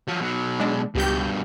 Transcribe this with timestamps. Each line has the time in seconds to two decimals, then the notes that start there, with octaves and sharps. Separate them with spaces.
0.08 F3 F#3
0.21 B2 F#3
0.59 G#3 D4
0.95 C#2 G2 B2 G4 G6